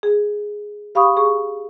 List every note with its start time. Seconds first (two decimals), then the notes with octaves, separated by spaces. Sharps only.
0.03 G#4
0.95 G4 F5 B5 C#6 D#6
1.17 G#4 C#6